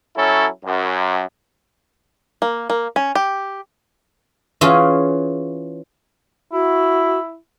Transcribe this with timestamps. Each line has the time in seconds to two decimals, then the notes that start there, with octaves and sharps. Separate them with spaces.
0.16 F#3 C#4 E4 A4
0.64 F#2
2.42 A#3
2.70 A#3
2.96 C#4
3.15 G4
4.61 E3 C#4 F4 G#4
6.53 E4 F#4